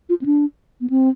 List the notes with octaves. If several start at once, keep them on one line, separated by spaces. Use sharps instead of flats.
F4
C4
D4
B3
C4